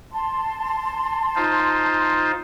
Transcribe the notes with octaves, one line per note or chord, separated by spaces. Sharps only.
A5 C6
D#4 F4 C5